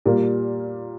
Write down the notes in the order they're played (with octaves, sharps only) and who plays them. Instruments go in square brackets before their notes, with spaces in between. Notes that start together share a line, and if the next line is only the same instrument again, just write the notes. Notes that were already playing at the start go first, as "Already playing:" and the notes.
[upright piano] A#2 G3 A#3